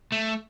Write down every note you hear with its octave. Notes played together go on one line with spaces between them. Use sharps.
A3